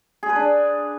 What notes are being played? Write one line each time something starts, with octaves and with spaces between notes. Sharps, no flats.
G#4
B4
D4